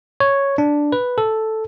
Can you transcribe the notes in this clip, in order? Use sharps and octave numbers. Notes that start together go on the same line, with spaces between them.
C#5
D4
B4
A4